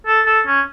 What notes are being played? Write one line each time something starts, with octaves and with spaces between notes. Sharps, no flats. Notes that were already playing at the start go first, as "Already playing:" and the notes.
A4
A4
C#4